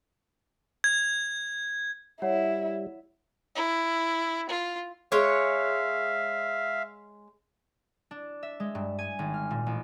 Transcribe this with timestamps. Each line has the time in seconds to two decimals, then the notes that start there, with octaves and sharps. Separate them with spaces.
0.84 G#6
2.22 G3 E4 C#5 F#5
3.55 E4
4.49 F4
5.12 G#3 C#5 E5 F5
8.11 D4
8.43 E5
8.60 G#3
8.75 G2
8.99 G#5
9.19 G#1
9.34 F6
9.51 A#2
9.66 A1